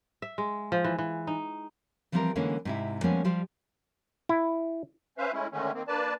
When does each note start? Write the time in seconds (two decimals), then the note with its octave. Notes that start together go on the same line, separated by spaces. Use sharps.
0.22 E5
0.38 G#3
0.72 F3
0.84 E3
0.98 E3
1.27 D#4
2.12 E3 F3 G3 C4 G4 A#4
2.36 D3 E3 G#3 A#3 C#4
2.65 G#2 C3 E4
3.03 F3 G3 G#3 A#3 B3 C#4
3.24 F3 G3 G4 C5
4.29 E4
5.18 C#4 B4 C5 E5 F5
5.32 G#3 A3 C#4 E4
5.52 D3 D#3 G#3 A3 C#4
5.74 D#3 A#3 C4
5.88 A#3 D4 B4 D5 A5